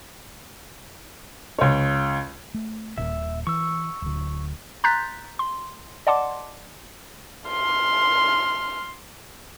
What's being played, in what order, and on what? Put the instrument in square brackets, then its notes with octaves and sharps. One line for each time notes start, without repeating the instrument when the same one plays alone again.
[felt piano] C#2 C#5
[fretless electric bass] A3
[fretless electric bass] D#1 A#2 [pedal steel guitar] E5
[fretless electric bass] E3 [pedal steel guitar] C#6 E6
[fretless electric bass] D1 D2
[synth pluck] A#5 C6 F#6 G6 A6 B6
C6
D5 D#5 F#5 A5 C6 D6
[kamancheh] C6 F6